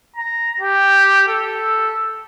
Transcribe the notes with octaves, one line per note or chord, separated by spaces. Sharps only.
A#5
G4
A4